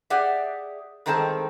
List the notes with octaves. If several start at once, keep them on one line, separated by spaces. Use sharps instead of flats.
G4 G#4 D5 E5 F#5
G2 D#3 G#3 C4 A4 A5